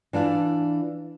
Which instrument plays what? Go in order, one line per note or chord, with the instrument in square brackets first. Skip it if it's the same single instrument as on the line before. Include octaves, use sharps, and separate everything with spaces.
[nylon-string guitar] E3 D4 F4 F5